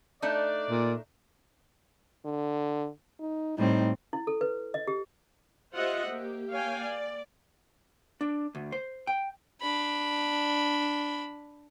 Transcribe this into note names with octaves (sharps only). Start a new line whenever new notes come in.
A3 D4 D#4 D5
A#2
D3
D#4
A2 G3 C4 D#4
E4
A4
B4
D#5
G4
F4 G4 C5 D#5 E5 F#5
A#3 G4
A#3 C#5 F5 G5 G#5
D5
D4
D2
C5
G5
D4 B5